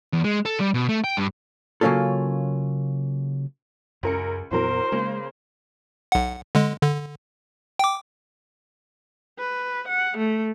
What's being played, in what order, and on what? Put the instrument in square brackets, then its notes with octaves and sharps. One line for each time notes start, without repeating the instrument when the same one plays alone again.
[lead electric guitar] E2
G#3
A4
G3
B2
A3
G5
G2
[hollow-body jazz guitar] C#3 F#3 A#3 C#4 F4 A4
[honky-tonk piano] C#2 A#4 C#7 [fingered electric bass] F#2
[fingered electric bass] F2 A#2 B3 [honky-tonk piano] E3 F#3 A#4 [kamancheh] C5
[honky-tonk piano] C#3 A#3 [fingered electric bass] G#3
[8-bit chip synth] B1 F#5
D3 G#3
D3
G5 D6
[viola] B4
F#5
A3